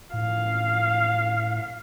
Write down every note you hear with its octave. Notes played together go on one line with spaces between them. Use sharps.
A2 F5